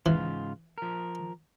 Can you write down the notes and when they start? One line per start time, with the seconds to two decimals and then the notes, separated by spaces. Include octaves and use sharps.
0.06 G#2 C#3 E3 F4
0.78 F3 A#4